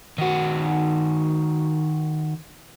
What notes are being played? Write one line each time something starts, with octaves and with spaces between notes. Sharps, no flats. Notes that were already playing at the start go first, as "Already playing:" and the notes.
D#3 F#4